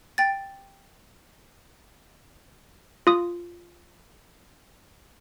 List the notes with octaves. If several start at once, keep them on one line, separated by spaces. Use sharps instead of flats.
G5 A6
F4 D#6